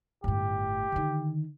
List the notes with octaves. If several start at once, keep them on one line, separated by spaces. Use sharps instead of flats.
G1 A2 G4
D3 D#3